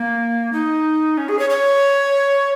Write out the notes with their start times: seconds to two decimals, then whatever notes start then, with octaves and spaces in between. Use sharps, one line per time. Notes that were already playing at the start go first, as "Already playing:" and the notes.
Already playing: A#3
0.53 D#4
1.18 C#4
1.29 G#4
1.39 C#5
1.50 C#5